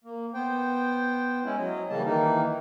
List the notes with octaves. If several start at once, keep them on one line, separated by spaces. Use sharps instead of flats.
A#3
B3 C5 G5
G#3 C#4 E4
F#3 D#5
C#3 E3 G3 A#3 A5
D#3 E3 A#3 D#4